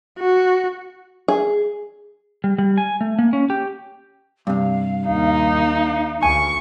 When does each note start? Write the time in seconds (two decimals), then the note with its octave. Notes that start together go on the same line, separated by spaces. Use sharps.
0.19 F#4
1.28 G#4
2.44 G3
2.58 G3
2.78 G#5
3.01 A3
3.19 A#3
3.33 C#4
3.50 G4
4.47 G2 C3 F5
5.08 D#2 D#4
6.23 D2 G#5 C#6